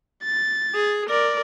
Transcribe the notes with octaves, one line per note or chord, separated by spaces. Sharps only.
A6
G#4
A#4 D5